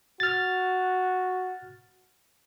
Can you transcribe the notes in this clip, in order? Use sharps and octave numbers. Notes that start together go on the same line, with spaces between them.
F#4 F6 A6